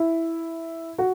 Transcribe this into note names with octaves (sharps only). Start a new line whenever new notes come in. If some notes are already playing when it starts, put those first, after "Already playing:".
Already playing: E4
F#4